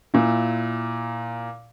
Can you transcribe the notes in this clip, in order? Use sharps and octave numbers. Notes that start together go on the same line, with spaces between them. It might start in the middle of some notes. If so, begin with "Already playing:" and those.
A#2 E4